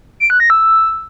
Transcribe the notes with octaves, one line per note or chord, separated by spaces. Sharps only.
D7
F#6
A#6
E6